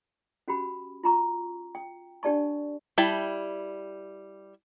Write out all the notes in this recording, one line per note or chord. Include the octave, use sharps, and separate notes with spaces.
C#4 F#4 G4 B5
F4 A#5 C#6
G5
D4 G4 D5 A5 C#6
G3 E4 G5 A5